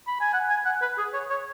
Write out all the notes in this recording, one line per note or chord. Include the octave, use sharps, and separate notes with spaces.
B5
G#5
F#5
G#5
F#5
B4
G#4
C#5
C#5